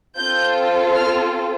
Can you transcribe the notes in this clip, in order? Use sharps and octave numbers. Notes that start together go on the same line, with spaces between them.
C4 F4 A4 G6
F6